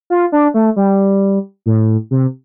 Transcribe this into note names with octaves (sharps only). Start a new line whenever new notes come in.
F4
D4
A3
G3
A2
C3